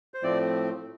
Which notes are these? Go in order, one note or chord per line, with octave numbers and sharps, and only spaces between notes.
C5
A2 F3 A3 C4 D5